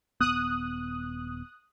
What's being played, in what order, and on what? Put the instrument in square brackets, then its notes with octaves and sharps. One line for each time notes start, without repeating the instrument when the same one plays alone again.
[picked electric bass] D#1 F#2 B3 [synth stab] D#6 F#6